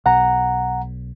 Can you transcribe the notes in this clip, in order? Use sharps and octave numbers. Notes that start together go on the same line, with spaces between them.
B1 F#5 A#5